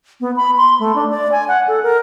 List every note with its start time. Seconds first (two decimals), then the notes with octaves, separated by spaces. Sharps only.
0.20 B3
0.36 B5
0.57 C6
0.79 A3
0.95 D4
1.10 D5
1.32 G#5
1.48 F#5
1.68 A4
1.83 A#4